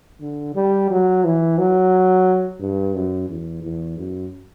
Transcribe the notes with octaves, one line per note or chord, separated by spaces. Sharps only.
D3
G3
F#3
E3
F#3
G2
F#2
E2
E2
F#2